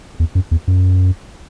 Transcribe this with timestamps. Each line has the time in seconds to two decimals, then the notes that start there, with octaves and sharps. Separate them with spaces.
0.20 E2
0.35 F#2
0.51 E2
0.68 F#2